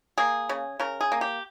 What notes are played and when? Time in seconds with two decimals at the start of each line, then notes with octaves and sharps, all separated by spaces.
0.18 A#3 G#4
0.49 C#3
0.80 C#3 A#4
1.01 G#4
1.12 A#3
1.21 G4